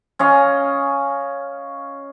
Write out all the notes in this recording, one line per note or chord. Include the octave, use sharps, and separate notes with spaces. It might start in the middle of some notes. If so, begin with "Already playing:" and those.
C#4 D#5 F5